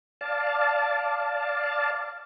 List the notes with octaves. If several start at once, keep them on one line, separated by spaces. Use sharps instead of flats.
D5 F5 A5